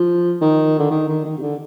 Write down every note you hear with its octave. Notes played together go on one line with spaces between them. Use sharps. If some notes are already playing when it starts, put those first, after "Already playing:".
Already playing: F3
D#3
D3
D#3
D#3
D#3
C3
D3